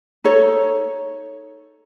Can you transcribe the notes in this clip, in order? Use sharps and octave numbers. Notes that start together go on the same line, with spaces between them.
D#4 A4 C#5